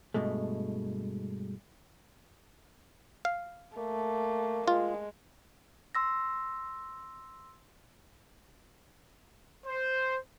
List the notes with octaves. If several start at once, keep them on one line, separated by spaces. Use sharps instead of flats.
G2 B2 G#3 A3
F5
A3 A#3
G#3 F4
C6 E6 A#6
C5